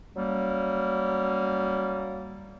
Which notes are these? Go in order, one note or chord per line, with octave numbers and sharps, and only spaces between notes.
F#3 G3 A#3 C#4